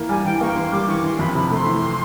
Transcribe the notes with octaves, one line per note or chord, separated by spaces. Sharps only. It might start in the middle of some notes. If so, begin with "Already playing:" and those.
Already playing: E3 A#3
G3 G#5
E3 G5
A#3 C#6
E3 C6
G3 D6
E3 C#6
E3 C6
F2 B5
C3 B5
A3 C6
E3